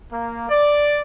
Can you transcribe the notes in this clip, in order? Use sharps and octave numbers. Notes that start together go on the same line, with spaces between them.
A#3
D5